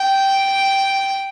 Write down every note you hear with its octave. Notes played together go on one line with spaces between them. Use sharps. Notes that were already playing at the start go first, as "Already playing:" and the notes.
Already playing: G5